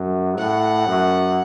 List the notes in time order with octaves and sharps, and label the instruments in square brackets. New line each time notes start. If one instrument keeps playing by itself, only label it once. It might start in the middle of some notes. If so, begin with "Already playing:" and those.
Already playing: [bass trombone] F#2
[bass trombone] A2 [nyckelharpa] F#5
[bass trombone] F#2